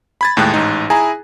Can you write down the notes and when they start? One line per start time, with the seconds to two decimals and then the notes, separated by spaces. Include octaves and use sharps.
0.21 B5 G#6 A6
0.37 D#2 A2 G#3 G5 F#6
0.54 A1 G#2 D#4
0.90 E4 G#4 G#5 A#5